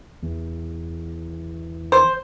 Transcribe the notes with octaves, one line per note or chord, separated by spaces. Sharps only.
E2
C5